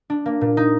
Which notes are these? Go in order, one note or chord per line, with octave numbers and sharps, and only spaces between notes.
D4
A#3
A#2
D#4